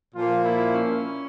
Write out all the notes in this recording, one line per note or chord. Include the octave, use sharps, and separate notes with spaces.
A#2 F3 A#3 F4
E4
C#4